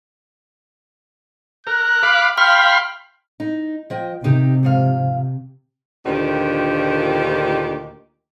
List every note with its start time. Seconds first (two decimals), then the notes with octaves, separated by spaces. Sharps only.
1.67 A#4 F#6
2.03 F5 B5 D6
2.38 F5 G5 B5 C6 F6
3.40 D#4
3.90 F3 D#5 G5
4.24 C3 A#3 D#4 G4
4.63 G#2 F3 F5
6.04 D2 A#2 D#3 F3 D4 G4